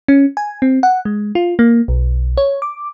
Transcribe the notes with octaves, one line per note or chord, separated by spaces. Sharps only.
C#4
G#5
C4
F#5
G#3
F4
A#3
B1
C#5
D6